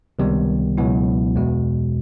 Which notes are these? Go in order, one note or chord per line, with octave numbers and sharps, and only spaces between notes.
C#2 C3 D#3 G3 B3
C#2 B2 F#3 B3 E4
E2 B2 G#3